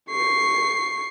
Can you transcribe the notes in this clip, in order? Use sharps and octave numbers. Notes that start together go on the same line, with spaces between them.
C#6 C7